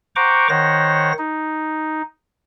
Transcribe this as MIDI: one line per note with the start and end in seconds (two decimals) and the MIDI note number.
0.16 0.48 72
0.16 0.48 78
0.16 0.48 79
0.16 0.48 82
0.16 0.48 85
0.16 0.48 86
0.49 1.12 51
0.49 1.12 72
0.49 1.12 73
0.49 1.12 78
0.49 1.12 94
1.18 2.02 63